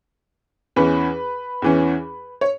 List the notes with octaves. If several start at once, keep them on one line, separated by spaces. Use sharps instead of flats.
E2 E3 C#4 B4
E2 E3 C#4
C#5